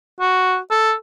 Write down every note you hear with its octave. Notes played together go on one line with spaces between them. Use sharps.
F#4
A4